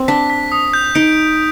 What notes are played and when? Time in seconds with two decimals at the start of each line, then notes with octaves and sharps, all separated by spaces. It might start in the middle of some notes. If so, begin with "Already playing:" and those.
Already playing: C4
0.08 D4 B6
0.30 B6
0.52 D#6
0.74 G6
0.95 D#4 D7